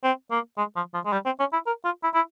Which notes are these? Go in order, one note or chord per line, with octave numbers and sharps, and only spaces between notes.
C4
A#3
G#3
F3
F3
G#3
G3
C4
C#4
E4
A#4
F4
E4
E4